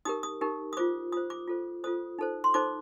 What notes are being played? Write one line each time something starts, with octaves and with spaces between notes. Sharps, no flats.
D#4 G4 A#4 D#6
D#6
D#4 G4 A#4
D#6
F4 C5 D6
F4 C5 D#6
D6
F4 A4 C5
F4 A4 C5 D#6
D#4 A4 C5
C6
D#4 A4 C5 D6